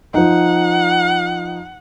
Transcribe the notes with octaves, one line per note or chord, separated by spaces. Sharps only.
F3 D#4 F#5